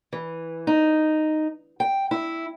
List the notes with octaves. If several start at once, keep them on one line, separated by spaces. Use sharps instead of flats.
E3
D#4
G5
E4